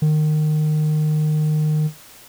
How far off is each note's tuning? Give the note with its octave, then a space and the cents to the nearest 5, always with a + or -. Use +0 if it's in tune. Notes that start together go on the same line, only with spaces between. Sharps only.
D#3 -25